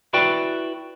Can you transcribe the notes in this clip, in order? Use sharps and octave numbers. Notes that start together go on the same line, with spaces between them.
E4 F#4 B4 D5 G5